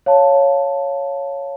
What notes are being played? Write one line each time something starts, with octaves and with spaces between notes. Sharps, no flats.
C#5 F5 A5